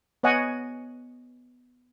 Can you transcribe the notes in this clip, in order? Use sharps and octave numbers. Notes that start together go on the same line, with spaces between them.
B3 C#5 D#5 F#5 G#5